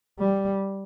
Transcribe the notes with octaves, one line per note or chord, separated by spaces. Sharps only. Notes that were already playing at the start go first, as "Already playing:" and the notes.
G3